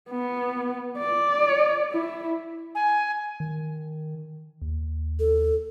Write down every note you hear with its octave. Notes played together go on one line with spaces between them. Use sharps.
B3
D5
E4
G#5
D#3
D#2
A4